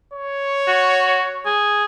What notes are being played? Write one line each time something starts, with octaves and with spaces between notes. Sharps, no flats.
C#5
F#4
G#4